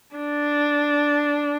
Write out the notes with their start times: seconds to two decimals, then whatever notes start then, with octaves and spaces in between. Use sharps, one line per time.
0.16 D4